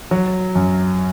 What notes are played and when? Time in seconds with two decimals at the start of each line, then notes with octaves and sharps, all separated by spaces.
0.11 F#3
0.55 F#2